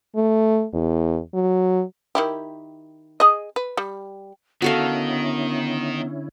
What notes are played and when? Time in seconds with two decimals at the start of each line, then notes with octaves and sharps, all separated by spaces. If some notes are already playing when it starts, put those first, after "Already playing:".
0.16 A3
0.73 E2
1.34 F#3
2.15 D#3 E4 G4
3.20 G#4 D#5
3.56 B4
3.77 G3
4.62 D3 D#3 B3 C#4 E4 F#4 A4 F5